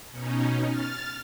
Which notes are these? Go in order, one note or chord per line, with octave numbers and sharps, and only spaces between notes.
B2 C#4 D#4
F6 A6